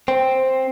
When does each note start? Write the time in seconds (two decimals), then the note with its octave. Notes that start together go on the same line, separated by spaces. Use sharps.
0.08 C4